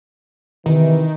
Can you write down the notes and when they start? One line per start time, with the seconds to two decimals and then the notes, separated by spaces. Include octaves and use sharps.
0.66 C3 D#3 E3